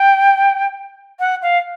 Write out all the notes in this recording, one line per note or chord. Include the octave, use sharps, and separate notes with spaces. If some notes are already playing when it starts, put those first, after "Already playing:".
Already playing: G5
F#5
F5